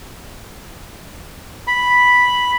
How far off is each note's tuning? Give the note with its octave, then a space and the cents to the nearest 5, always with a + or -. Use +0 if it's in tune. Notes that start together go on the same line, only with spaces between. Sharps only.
B5 -5